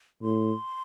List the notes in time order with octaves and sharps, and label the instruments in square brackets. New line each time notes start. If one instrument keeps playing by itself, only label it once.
[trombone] A2 [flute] C6